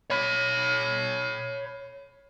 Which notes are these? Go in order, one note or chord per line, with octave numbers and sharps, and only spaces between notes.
C#5 B5